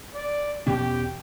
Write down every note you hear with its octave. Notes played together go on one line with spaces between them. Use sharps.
D5
E2 B2 C#4 G4